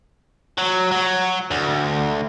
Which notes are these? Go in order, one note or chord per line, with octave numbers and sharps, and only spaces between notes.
F#3
F#3
D2